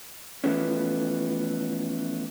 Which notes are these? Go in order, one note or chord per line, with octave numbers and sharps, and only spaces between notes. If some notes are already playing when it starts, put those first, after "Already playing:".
E3 F3 A3 B3 C#4